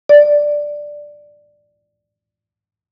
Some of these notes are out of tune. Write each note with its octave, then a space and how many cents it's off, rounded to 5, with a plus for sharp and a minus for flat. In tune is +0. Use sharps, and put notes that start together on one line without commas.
D5 +5